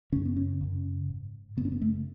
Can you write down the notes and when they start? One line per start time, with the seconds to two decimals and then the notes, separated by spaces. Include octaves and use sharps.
0.12 F#2 C#3 C#4
0.25 B3
0.37 C#4
0.61 F#2 C#3
1.09 G#2
1.57 F#2 C#3 B3
1.65 C#4
1.72 B3
1.82 A3